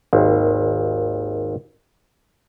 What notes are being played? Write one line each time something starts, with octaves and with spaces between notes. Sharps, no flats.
G#1 D#2